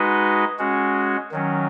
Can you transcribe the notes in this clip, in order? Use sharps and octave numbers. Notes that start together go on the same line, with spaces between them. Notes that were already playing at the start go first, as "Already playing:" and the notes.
Already playing: G#3 D#4 F#4 B4 D#5
G#3 C#4 F#4
D#3 F#3 C#4